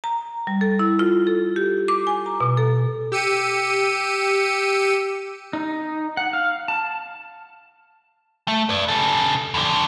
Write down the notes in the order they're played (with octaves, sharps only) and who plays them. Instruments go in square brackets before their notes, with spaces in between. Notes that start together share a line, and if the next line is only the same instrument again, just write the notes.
[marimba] A#5
G3
A4
E4
F4
A4
G4
D6
G#5
A#5
B2
A4
[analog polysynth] G4 E6 C#7 D#7
[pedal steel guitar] D#4
F#5
F5
A5
[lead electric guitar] A3
B4 D5
C#3 A4
F2 D3